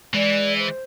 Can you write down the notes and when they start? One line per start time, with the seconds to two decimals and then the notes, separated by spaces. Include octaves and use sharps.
0.14 E3 G#3 D5
0.58 C5